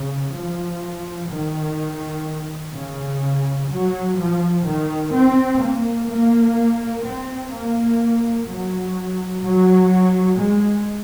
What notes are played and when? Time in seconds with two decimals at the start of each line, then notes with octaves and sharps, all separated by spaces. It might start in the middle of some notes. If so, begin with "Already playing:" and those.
Already playing: C#3
0.34 F3
1.30 D#3
2.74 C#3
3.70 F#3
4.18 F3
4.66 D#3
5.12 C4
5.61 A#3
6.08 A#3
7.05 C4
7.52 A#3
8.48 F#3
9.43 F#3
10.40 G#3